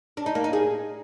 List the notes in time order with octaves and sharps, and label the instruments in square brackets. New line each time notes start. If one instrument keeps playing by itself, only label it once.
[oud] D4
D#4
A#3
D#4
G#4